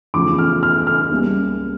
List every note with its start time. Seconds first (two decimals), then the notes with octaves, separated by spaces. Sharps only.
0.14 E2 C#3 F3 A3 D6
0.38 F6
0.63 F6
0.87 F6
1.11 C#2 C#3 G3 A#3